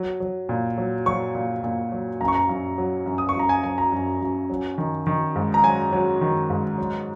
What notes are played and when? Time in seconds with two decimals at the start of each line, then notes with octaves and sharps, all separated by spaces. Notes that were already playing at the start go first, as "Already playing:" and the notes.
Already playing: F#3
0.20 F#3
0.49 A#2
0.78 F#3
1.06 F#3 C#6
1.35 A#2
1.64 A#2
1.92 F#3
2.21 F#2 A#5
2.28 C#6
2.35 A#5
2.49 F#2
2.78 F#3
3.06 F#2
3.18 D#6
3.29 C#6
3.35 F#2 A#5
3.49 G#5
3.63 F#3 G#5
3.78 A#5
3.92 F#2
4.21 F#2
4.49 F#3
4.78 D#3
5.07 D#3
5.36 G#2
5.54 A#5
5.64 F#3 G#5
5.93 F#3
6.21 D#3
6.50 G#2
6.78 F#3